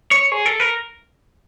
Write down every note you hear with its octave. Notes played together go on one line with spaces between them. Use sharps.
C#5
G#4
A4
A#4